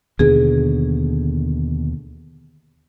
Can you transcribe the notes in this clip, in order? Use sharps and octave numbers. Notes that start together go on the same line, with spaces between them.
D#2 B2 D3 G#4